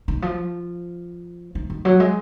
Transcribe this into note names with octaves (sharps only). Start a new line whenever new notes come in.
D#3
F3
D#3
D#3
F#3
G#3